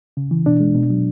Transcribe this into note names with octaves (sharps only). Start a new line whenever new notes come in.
C#3
E3
B2 D4
G#3
B2
F#3